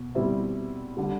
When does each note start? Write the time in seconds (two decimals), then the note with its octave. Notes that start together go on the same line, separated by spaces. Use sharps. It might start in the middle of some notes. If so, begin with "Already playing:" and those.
Already playing: B2
0.15 B2 G3 C4 E4
0.97 D3 G3